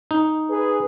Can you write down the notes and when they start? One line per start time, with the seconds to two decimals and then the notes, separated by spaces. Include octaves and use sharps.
0.11 D#4
0.49 G#4 B4